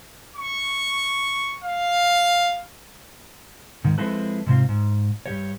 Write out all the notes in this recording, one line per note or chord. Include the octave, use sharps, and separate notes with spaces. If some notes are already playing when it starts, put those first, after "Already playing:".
C#6
F5
G#2 D#3
F3 G#3 C4 E4 A4 B4
G#2 C3 C4 F4
G#2
G2 G4 C#5